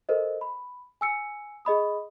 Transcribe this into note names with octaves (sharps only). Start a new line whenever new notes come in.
A4 A#4 C5 D#5
B5
G#5 E6 C#7
G#4 D#5 B5 D#6